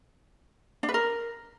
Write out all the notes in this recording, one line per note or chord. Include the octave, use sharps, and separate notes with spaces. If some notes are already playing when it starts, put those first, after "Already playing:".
D4
B4
A#4